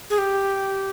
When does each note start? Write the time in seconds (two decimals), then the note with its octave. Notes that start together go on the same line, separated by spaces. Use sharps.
0.10 G#4
0.18 G4